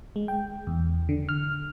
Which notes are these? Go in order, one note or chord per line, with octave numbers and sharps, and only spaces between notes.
G#3
G5
E2
D3
F6